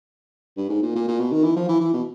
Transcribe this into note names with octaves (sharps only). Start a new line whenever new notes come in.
G2
G#2
A#2
A#2
A#2
B2
D#3
E3
F3
E3
E3
B2